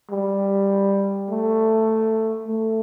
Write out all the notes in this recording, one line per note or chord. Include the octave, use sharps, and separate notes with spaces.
G3
A3
A3